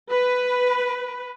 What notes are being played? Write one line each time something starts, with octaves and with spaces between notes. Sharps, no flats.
B4